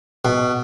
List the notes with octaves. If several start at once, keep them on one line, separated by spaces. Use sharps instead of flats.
B2